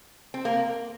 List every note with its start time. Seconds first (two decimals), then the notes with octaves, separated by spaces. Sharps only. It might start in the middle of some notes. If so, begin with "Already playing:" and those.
0.34 C4
0.45 A#3